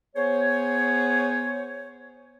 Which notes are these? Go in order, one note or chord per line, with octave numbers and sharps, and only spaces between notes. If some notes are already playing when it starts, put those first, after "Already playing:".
B3 G#4 C5 C#5